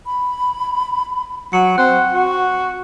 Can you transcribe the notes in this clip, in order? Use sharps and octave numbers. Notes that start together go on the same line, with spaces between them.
B5
F#3 F#5 C#7
C4 F#6
F#4